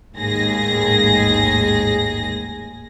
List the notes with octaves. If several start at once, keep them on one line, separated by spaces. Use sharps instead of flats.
A1 D#2 G#2 G#4 A#6